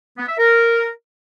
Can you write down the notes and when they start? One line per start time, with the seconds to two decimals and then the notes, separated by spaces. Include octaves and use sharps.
0.18 B3
0.28 E5
0.38 A#4